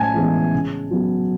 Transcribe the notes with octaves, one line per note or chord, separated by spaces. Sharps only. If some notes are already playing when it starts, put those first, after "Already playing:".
Already playing: A2 G#5 A5
E3 G#3 B3
C#3
F#3 B3